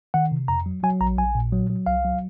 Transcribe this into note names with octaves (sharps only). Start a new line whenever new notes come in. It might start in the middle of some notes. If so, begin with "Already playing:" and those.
D#3 F#5
C3
F2 A#5
F#3
F#3 G#5
A#1 A#5
A#1 G#5
A#2
F#3
F#3
C2 F5
F#3